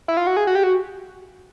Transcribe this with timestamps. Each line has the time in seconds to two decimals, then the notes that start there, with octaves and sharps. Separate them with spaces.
0.08 E4
0.17 F4
0.27 F#4
0.37 G#4
0.47 F#4
0.55 G4
0.63 F#4